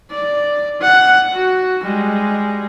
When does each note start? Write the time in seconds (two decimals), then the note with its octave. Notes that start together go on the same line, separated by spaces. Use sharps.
0.10 D5
0.81 F#5
1.33 F#4
1.82 G3 G#3